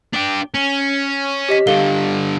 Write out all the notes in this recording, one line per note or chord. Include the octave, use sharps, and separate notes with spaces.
D4 G4
C#4
G4 D#5 B6
G2 D3 A4 F5 G7